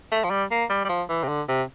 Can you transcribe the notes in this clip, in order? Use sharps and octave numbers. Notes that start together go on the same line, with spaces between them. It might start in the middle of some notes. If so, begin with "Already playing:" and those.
A3
F3
G3
A#3
G3
G3
F3
E3
C3
D3
C3